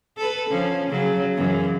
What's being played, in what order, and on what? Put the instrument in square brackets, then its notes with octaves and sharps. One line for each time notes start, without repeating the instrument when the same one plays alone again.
[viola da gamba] A4 B4
D3 F3 C#4
C#3 F#3
F#2 C#3 E3